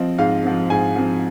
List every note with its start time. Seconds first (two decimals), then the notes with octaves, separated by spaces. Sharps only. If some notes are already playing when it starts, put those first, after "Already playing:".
Already playing: F3 C4 D#5
0.18 G#2 F5
0.44 F3 C4
0.70 G#2 G#5
0.96 F3 C4